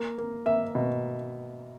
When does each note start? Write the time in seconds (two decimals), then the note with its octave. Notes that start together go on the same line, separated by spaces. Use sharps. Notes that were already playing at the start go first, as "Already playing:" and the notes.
Already playing: A#3
0.18 A#3
0.46 A#3 E5
0.75 B2